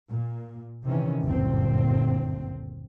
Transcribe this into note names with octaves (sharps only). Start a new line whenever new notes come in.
A#2
C3 D#3 E3 C#4
F#1 D2 G2 A#2 C4